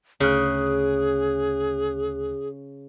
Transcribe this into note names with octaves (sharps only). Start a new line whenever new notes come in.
D2 C#3 G#4 F#6